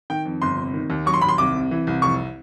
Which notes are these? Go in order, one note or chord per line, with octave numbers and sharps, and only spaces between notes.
D#3 G5
F2
G1 C6
C3
D#3
D#2
F#3 C#6
C6
D#2 B5
C6
C2 D6
C3
E3
C2
F1 C#6